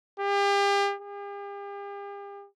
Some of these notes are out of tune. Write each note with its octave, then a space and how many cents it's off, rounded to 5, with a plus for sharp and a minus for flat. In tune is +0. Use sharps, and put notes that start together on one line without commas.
G4 +40
G4 +45